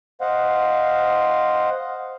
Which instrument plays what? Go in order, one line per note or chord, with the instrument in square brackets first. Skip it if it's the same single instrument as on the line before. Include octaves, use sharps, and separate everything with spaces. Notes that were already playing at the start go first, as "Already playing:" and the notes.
[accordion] C5 D#5 F5 F#5